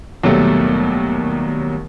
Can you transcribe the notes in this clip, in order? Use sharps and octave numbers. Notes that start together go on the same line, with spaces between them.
D#2 B2 F#3 G3 A3